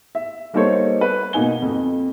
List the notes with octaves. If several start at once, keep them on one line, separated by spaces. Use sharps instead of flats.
E5
G3 A#3 D#4 A4 C5 C#5
B4
B2 A#3 D#4 G#5 G7
F2